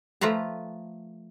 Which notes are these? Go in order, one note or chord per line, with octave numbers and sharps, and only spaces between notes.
F3 A3 F4 B4 A#5